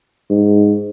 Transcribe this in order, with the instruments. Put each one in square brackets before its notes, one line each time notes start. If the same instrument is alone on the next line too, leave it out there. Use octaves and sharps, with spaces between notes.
[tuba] G#2